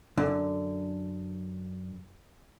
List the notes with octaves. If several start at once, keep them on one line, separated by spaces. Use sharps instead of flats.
F#2 D3